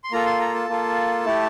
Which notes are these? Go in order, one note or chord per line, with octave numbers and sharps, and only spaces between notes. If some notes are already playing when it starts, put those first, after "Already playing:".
C6
A#3 F4 A4 A#5
C6
A#5
A5
A#3 F4 A4
A3 E4 G4